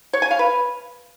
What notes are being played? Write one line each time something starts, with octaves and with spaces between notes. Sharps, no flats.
C#5
G#5
F5
B4